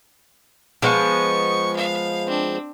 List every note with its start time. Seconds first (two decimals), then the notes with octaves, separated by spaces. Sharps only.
0.82 F3 G#3 B3 C#6
1.76 F5
2.26 C4 D4